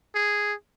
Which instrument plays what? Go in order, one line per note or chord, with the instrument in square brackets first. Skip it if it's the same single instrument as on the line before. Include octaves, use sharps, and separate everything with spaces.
[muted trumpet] G#4